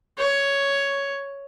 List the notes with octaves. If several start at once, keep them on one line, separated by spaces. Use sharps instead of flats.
C#5